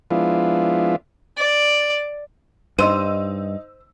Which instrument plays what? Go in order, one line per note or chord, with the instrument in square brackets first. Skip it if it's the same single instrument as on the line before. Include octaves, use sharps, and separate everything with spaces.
[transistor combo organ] F3 G#3 B3 D4 E4 F4
[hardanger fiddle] D5
[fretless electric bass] G2 [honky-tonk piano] D#4 E6 D#7 [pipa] C5